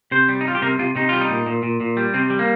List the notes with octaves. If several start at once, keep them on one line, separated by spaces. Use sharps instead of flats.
C3 C5
G3
D#4
G3 F4
G4
C3 A#4
C3 F4
C3 D#4
G3 F4
D#4
A#2
A#2
A#2
A#2
G3
C3 C4
G3
A#3